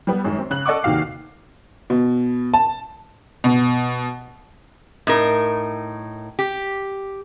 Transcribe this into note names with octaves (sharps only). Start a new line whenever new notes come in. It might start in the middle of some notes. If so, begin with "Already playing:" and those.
G3 B3
F#2 D#3 G#3
C4
C#3 F#6 F#7
A4 D5 D#5 F#5 C#6 D6
D#2 C3 D#3 F#4 F5 C7
B2
A5
B2
A2 D#4 A#4
G4